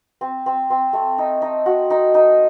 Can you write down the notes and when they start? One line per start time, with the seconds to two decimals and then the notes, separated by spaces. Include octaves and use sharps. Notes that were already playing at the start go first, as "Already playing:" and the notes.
0.21 C4
0.46 C4
0.70 C4
0.93 A3
1.18 D#4
1.42 D#4
1.66 F#4
1.90 D#4
2.14 D#4